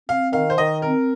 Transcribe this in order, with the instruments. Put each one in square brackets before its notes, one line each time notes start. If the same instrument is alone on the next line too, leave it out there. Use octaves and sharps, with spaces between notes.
[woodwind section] C4 [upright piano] F5
[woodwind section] D#3 [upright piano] F5
[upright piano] C5
[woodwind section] D#3 [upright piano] D#5
[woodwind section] C4 [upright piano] A#4